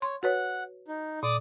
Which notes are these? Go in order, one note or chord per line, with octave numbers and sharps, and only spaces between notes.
C#5 C6
F#4 B4 C#5 F#5
D#4
A#2 D5 D6 D#6